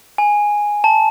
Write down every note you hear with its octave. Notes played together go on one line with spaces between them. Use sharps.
G#5
A5